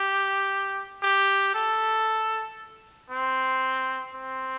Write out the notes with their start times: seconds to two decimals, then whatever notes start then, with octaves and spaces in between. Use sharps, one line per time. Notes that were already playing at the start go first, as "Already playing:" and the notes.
Already playing: G4
1.03 G4
1.55 A4
3.11 C4
4.14 C4